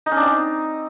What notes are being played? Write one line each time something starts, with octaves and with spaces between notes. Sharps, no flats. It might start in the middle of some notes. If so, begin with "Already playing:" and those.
D#4
C#4
D4
C4
D#4